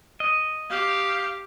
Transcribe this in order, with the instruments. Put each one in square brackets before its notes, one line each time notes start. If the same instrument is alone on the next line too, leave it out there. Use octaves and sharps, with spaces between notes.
[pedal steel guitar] D#5
[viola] G4 [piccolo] F5